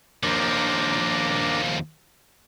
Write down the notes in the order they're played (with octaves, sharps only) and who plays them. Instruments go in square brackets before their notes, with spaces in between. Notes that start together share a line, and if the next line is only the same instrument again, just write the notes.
[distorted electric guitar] D#2 F3 [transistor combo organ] A#3 D4